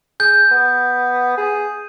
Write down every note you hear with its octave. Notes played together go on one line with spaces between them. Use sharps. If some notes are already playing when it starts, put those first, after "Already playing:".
G#4 G6
B3
G#4